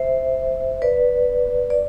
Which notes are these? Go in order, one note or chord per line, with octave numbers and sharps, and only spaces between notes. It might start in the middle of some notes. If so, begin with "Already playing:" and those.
Already playing: C5 E5
B4 D5
D5